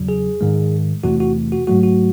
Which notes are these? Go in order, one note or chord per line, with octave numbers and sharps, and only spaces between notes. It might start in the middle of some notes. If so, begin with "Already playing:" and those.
Already playing: E2 C#3 F#3
G#4
G#2 D#3 G#3
E2 C3 E3 A3 F#4
F#4
F#4
G#2 F#3 A3 F#4
F#4